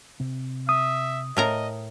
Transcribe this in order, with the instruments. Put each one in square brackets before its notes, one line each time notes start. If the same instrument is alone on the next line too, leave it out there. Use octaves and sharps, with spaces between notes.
[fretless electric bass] C3 C4
[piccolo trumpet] E5 [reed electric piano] D#6
[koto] A2 A#4 A#5 [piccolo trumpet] D#5